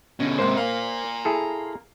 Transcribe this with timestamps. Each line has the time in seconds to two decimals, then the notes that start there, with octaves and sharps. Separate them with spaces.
0.20 B2 D3 C#4
0.39 G#2 C3 A#3 C5 C6
0.57 A#3 F5 A#5 C6
1.25 E4 G#4 A4